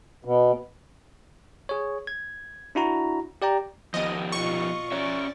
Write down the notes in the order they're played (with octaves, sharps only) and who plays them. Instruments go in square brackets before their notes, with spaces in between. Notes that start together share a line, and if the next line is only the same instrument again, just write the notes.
[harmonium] B2
[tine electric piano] G#4 C#5
G#6
D4 E4 F#4 A#5
G4 D5 G5 A#5
[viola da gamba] D#3 [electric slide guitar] F3 B3 G4 [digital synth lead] D#5
[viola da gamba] B2 F4 D#5 [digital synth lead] C#6
[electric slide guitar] C#4 C#5 E5 [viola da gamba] D5